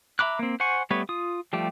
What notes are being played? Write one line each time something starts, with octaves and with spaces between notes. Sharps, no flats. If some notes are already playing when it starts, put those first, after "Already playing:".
E5 A#5 B5 D6 F#6
A#3 C4
C5 F#5 G#5 C#6
G3 A3 B3 B4 C#5
F4 D#6
F3 G3 A3 G4